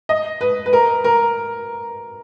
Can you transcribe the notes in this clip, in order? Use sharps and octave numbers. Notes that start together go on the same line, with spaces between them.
D#5
B4
B4
A#4
A#4